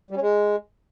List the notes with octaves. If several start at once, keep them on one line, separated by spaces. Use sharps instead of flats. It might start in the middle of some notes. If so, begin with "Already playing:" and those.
G3
C#4
G#3